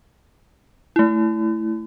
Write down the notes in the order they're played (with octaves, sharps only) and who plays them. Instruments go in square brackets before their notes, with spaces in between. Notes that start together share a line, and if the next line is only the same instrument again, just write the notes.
[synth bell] A3 E4